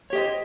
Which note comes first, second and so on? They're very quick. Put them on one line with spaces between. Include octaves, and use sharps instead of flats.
C#5 G4 D#5 C5